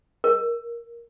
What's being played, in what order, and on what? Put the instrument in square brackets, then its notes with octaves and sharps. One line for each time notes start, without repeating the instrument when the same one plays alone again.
[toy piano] A#4